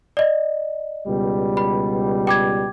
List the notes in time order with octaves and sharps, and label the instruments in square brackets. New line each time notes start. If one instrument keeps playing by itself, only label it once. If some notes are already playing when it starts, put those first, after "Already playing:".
[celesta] D5 D#5
[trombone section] C#2 B2 G3
[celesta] B5
G5 D6 G#6